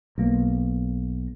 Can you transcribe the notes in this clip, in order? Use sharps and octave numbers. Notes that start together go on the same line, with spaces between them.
B1 A#3